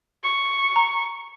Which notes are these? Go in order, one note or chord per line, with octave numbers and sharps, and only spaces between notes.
C#6
A#5